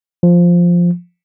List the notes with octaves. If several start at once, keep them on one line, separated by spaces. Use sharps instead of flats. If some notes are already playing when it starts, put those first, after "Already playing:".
F3